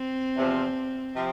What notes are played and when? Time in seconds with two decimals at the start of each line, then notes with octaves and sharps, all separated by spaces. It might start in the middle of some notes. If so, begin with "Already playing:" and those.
Already playing: C4
0.36 E2 C3 F3
1.15 C3 F3